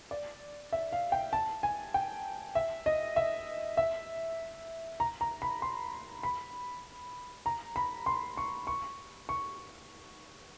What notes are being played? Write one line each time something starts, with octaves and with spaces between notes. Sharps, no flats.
D5
E5
F5
G5
A5
G#5
G5
E5
D#5
E5
E5
A#5
A#5
B5
C6
B5
A#5
B5
C6
C#6
C#6
C#6